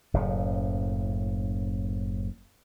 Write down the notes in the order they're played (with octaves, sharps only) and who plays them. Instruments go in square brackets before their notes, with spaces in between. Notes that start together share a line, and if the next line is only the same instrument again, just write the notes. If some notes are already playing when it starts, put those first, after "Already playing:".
[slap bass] F#1 A2 C#3